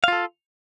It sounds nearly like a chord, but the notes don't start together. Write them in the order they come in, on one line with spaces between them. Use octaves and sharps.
F5 F4 A4